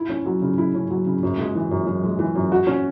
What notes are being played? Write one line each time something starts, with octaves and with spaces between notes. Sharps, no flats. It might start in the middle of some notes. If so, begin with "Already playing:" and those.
Already playing: E4
C#4
F#3
C#3
E4
C#4
F#3
C#3
F#2
G#3
E3
F#2
F#2
G#3
E3
F#2
F#4
C#4